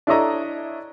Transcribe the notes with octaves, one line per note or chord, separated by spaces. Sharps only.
D4 E4 A4 C#5 D#5 A#5